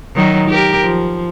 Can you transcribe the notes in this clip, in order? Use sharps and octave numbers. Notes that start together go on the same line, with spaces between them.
D#3 F#3 D#4
G4 A#4
F3